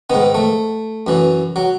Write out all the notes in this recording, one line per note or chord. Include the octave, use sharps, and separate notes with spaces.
G#2 D#3 B3
A3
F#2 E3
F#3